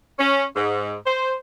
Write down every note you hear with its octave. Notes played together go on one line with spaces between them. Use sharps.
C#4
G#2
C5